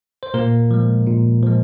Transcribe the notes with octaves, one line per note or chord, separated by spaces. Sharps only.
C5
A#2 A#3 A#4
F3 G#3
A#2
F3 G#3